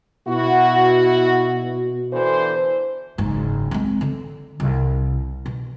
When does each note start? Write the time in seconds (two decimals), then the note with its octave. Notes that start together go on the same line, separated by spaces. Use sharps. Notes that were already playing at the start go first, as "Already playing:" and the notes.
0.28 B2 E4 F#4
2.13 D3 E3 C5
3.18 F#1 G#2
3.71 G#3 C4
4.01 D3
4.60 C2
5.46 B2